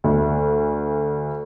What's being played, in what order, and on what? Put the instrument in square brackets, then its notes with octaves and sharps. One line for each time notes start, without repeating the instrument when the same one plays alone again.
[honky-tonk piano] D2